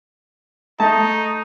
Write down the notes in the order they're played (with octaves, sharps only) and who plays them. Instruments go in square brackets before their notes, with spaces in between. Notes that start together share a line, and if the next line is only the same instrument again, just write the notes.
[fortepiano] A3 A5 [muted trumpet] D#4